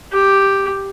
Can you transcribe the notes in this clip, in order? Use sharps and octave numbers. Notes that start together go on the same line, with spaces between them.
G4